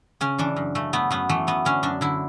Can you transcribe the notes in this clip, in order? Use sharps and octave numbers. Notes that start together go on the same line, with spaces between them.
C#3 C#4
E3 D4
F#2
C#3 A3
A3 B3
F#2 B3
E3 A3
F#2 B3
D3 C#4
F#2 D4
D3 E4